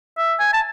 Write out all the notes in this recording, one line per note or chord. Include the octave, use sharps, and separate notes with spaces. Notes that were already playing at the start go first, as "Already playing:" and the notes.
E5
G#5
A5